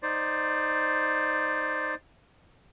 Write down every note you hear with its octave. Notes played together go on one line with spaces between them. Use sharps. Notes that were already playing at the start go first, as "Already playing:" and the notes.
D#4 C5 D5